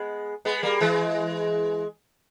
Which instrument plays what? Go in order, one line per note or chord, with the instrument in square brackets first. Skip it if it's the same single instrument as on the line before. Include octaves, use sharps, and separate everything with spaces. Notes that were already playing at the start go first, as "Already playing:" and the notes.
Already playing: [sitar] G#3 B3
G#3 B3
G3 A#3
E3 G#3